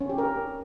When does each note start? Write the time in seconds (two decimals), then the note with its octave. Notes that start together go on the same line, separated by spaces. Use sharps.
0.01 C#4
0.09 G4
0.18 A#4